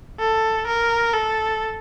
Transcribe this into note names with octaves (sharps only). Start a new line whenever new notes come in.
A4
A#4
A4